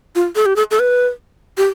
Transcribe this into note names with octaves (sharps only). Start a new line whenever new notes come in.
F4
A4
G4
A4
A4
B4
G4